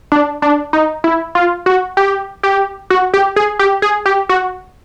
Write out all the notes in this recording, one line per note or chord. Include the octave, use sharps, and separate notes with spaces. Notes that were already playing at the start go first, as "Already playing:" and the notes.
D4
D4
D#4
E4
F4
F#4
G4
G4
F#4
G4
G#4
G4
G#4
G4
F#4